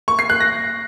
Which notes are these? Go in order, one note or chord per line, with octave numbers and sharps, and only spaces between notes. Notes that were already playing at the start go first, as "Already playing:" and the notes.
C#6
C7
F#6
A#6